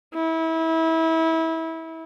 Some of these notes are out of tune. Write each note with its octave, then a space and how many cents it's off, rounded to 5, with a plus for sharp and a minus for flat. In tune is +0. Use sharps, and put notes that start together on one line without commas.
E4 -25